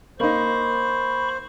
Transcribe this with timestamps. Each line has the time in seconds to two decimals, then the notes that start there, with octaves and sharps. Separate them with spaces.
0.20 A#3 D#4 C5 B5 C#6